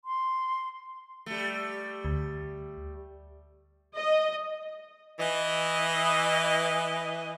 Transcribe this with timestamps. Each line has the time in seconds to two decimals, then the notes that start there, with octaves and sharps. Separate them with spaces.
0.05 C6
1.26 G3 A3
2.05 D2
3.97 D#5
5.19 E3 D#5